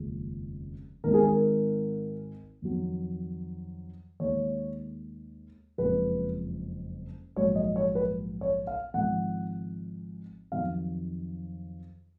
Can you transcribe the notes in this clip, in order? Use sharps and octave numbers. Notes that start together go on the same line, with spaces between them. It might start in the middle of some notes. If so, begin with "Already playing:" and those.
Already playing: F1 D#2 C#3 F3 G#3
G#1 G#2 D#3 A#4
G#4
A#4
F2 D#3 F#3
D#2 D#3 G#3 C#5
F#1 F2 F3 G#3 B4
A#1 G#2 F#3 C#5
D#5
C#5
B4
C#5
F5
G#1 G#2 F3 F#5
F2 D#3 F#3 F5